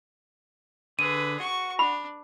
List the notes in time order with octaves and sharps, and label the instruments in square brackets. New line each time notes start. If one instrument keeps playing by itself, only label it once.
[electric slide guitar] D3 [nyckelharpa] G#4 B4 [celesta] D#7
[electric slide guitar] F#4 [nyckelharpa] C#6
[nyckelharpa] D4 [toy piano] B5